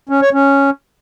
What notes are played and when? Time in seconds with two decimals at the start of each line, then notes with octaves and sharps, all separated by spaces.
0.09 C#4
0.21 C#5
0.33 C#4